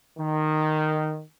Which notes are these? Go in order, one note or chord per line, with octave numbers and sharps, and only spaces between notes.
D#3